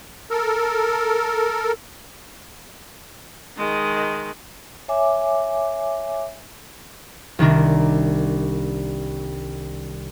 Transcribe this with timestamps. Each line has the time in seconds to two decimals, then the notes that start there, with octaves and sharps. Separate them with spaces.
0.30 A4 A#4
3.58 D#3 G#3
4.88 C#5 E5 G#5 D6
7.39 C2 D#3 D4 A#4